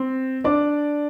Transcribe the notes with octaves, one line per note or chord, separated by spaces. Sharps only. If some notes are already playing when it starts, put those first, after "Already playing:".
Already playing: C4
D4 D5